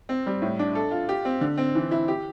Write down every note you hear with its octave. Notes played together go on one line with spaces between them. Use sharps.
C4
G3
A2
D4
A4
F4
G4
C4
D3
C4
E3
E4
G4